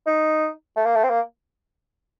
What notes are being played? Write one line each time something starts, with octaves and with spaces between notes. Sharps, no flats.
D#4
A3
A#3
A3
C4
A#3